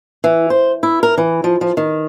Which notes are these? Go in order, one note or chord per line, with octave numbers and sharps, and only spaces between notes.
E3
C5
E4
A#4
E3
F3
F3
D#3